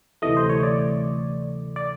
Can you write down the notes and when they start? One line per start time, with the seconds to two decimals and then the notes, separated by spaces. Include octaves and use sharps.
0.22 D2 C3 E3 A3 D#5
0.37 C5
0.49 C#5
0.63 D5
1.76 D5